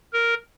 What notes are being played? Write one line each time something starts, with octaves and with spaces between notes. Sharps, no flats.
A#4